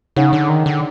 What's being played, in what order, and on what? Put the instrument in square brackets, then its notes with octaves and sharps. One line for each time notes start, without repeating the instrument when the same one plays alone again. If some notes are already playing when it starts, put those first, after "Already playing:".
[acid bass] C#3 [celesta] D#4 G#4 C#5 F#5
[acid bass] D3
D#3
D3